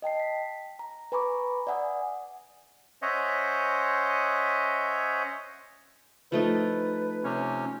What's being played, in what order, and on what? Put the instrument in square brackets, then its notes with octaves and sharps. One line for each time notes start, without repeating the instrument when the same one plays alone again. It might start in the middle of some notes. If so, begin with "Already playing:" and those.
[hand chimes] D#5 G5 A5 C7
B6
A#5
B4 G#5 A#5 B5 C#6 D6
D5 E5 F#5 G#5 D#6
[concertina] C#4 C5 C#5 D#5 E5 F#5
[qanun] F3 A3 D#4 [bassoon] B4
[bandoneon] C3 C#4